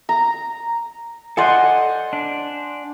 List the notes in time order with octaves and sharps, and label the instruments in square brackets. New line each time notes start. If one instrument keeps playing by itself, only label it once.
[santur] A#5
[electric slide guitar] A4 D5 D#5 [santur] C5 F#5 G#5
[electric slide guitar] D4